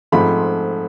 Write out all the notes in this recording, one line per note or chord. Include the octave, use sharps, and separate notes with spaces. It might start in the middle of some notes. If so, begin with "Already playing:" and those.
G#2 F3 A3 C4 B5